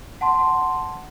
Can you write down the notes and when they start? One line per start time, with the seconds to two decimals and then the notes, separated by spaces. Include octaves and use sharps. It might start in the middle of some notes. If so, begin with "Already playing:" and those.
0.21 F#5 A5 C6